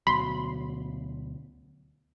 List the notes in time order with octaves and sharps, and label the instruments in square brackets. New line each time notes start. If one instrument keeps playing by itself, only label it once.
[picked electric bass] D2 B2 F#3 [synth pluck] B5 C6